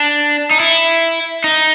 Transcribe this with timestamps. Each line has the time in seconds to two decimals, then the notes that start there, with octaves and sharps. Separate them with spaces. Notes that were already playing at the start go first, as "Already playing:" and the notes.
Already playing: D4
0.51 D#4
0.60 E4
1.44 D#4